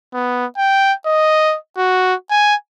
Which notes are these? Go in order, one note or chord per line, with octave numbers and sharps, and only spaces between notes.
B3
G5
D#5
F#4
G#5